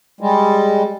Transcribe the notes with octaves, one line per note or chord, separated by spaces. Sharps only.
G3 G#3